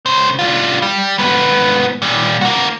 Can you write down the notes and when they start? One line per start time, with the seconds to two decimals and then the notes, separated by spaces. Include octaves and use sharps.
0.06 C#3 C5
0.39 G3 F4
0.82 G3
1.18 G#2 B3
2.02 A#2 G3
2.41 A#3 F#4